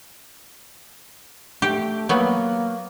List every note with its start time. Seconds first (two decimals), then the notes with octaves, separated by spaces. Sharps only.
1.62 A3 G4
2.09 F#3 A#3 B3